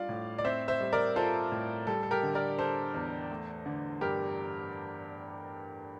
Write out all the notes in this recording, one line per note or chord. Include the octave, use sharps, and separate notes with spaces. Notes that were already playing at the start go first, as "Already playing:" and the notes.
Already playing: G3 D4 F4 D5 F5
A2
D5
C4 C5 E5
C5 E5
G3
A#4 D5
F4 A4 C5
A2
G3 A4
A4
G4 A#4
D3
A#4 D5
D4 A4 C5
E2
A3
D3
G2 G4 A#4